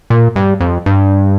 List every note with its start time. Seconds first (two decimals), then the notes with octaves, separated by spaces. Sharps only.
0.10 A#2
0.36 G2
0.60 F2
0.86 G2